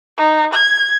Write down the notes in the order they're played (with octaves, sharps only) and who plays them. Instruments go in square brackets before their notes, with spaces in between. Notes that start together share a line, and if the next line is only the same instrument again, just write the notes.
[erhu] D#4
G#6